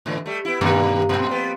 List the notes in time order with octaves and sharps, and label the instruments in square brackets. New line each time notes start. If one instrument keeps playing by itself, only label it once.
[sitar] G#2 D3 E3
G3 A3
B3 E4
[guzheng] G2 A#3 A4 [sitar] A#2 D#3 G3
[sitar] A#2 [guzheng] F3 C4
[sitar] G3 B3